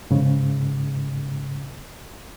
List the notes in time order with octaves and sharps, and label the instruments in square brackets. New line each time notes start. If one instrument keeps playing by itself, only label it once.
[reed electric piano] G#2 C#3